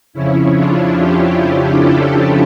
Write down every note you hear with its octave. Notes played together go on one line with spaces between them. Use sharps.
F2 C#3 F3 C#4 E4
D4 F4
E4 G4
F4 A4